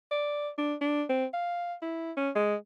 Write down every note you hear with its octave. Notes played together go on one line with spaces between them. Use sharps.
D5
D4
D4
C4
F5
E4
C#4
G#3